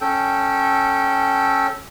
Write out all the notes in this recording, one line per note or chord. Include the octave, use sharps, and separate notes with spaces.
C#4 A4 G5